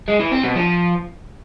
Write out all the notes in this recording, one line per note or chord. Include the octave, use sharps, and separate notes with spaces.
G#3
E3
C4
B2
F3